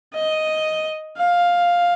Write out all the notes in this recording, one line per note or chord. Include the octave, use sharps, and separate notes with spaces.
D#5
F5